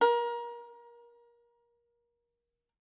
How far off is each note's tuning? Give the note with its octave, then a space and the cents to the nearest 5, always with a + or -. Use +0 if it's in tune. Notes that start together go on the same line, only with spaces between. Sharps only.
A#4 +25